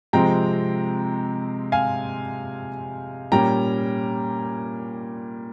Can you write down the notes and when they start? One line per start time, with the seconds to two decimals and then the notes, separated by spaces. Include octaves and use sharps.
0.13 C3 F3 G#3 C4 G5 A#5
1.72 F5 G#5
3.32 A#2 G3 C#4 G5 A#5